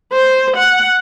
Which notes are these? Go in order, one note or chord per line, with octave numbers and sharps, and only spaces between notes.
C5
F#5